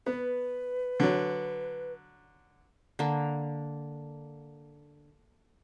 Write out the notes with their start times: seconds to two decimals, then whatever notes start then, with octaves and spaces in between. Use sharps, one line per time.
0.06 B3 B4
1.00 D3 F#3
2.99 D3 A#3